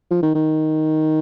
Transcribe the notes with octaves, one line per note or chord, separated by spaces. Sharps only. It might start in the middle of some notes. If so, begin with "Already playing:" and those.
F3
D#3
D#3